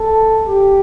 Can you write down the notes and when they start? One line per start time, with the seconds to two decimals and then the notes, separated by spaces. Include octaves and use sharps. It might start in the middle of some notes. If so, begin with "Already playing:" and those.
Already playing: A4
0.46 G4